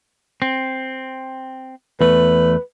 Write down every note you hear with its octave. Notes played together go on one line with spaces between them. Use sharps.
C4
E2 A3 B4